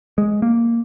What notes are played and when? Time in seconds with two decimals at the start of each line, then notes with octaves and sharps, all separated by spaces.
0.18 G#3
0.42 A#3